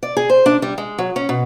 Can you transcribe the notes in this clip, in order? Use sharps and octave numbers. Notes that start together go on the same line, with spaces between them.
D5
G#4
C5
D4
G3
G#3
F#3
C#4
B2